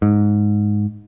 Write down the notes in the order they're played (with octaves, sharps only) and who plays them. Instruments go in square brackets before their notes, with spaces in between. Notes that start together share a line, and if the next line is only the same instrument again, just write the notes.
[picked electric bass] G#2